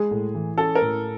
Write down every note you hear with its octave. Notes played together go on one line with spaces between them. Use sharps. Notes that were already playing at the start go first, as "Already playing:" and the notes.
Already playing: G#3 G#4
A2
E3
C#4 A4
A#4
A2